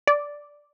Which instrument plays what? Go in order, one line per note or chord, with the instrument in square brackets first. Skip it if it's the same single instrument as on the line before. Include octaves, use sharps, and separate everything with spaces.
[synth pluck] D5